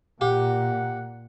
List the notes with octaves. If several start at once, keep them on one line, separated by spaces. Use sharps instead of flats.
A#2 G4 F#5